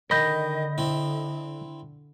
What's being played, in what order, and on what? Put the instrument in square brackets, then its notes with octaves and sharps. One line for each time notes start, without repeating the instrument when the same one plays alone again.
[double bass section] D3 [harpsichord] D#3 [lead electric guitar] D#5 [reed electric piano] B5 G6
[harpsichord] C4 E4